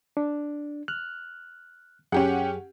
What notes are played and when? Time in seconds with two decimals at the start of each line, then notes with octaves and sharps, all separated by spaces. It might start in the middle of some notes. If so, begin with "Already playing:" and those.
0.17 D4
0.88 F6 F#6
2.12 F#2 C#4 G4 G#4 F#5